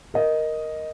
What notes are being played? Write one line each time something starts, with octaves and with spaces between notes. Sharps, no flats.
A#4 D#5